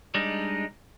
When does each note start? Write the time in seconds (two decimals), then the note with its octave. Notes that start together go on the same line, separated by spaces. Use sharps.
0.14 G3 G#3 D4 D#4